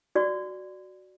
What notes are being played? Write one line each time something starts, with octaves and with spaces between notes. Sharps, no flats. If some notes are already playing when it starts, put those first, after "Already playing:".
F#4 D5 C#6